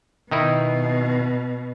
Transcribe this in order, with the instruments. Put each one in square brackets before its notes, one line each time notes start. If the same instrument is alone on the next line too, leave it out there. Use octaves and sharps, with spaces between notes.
[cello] B2 [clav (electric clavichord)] D#3 D#4 E4